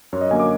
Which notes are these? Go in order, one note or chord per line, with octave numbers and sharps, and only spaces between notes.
F#2 C#5
D#5
D3 F#3 A#3 G#5
D6